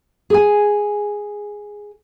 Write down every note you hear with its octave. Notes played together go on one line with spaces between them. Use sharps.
G#4 G#5